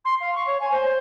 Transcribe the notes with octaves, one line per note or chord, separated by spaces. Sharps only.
C6
F5
C#6
C#5
G#5
C5